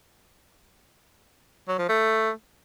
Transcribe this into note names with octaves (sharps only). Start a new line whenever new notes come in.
F#3
F3
A3